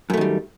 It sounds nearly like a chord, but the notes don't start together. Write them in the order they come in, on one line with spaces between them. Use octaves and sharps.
F#2 A3 D#3 G3